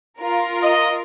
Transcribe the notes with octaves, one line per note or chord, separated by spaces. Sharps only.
F4 A#4
D#5